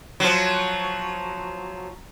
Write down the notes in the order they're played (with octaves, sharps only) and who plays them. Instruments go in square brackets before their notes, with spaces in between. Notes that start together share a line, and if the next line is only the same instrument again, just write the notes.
[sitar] F3 F#3